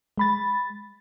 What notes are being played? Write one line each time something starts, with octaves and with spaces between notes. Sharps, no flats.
G#3 B5 A6